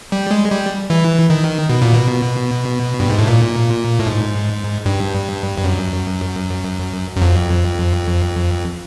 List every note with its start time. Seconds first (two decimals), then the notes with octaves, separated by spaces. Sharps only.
0.12 G3
0.31 G#3
0.52 G3
0.90 E3
1.30 D#3
1.69 B2
1.82 A#2
1.94 B2
3.00 G2
3.10 G#2
3.19 A2
3.27 A#2
4.00 A2
4.06 G#2
4.86 G2
5.58 G2
5.64 F#2
7.16 F#2
7.22 F2